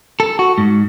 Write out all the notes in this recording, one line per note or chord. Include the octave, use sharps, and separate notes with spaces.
A4
F#4
G#2